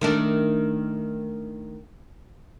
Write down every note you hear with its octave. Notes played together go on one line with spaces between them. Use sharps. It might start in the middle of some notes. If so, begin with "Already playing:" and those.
D#3 A3 D4